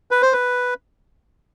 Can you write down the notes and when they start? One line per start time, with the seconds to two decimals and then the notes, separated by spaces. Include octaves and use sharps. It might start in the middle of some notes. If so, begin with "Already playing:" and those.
0.11 B4
0.22 C5
0.33 B4